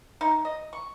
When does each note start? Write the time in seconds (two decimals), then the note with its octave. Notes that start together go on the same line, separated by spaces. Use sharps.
0.21 D#4
0.45 D#5
0.73 C#6